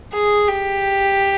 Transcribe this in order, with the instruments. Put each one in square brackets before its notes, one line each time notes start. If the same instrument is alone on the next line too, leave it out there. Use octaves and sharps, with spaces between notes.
[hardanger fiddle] G#4
G4